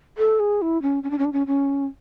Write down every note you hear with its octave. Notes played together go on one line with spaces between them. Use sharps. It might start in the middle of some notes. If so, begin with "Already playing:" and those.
A4
G#4
E4
C#4
C#4
D4
C#4
D4
C#4
C#4